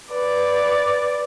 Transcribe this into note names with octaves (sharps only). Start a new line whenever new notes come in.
B4 D5